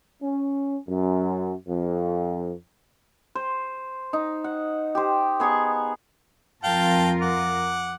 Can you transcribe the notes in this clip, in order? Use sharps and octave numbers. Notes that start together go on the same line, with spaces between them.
C#4
F#2
F2
C5
D#4
F#5
G4 C5
B3 G#4 A#5 C#6
F2 F4 A#4 F5 G5 A5
F#5 D6